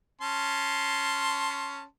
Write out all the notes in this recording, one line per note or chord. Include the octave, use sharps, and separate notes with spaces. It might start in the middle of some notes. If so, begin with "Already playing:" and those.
C#4 A5 C6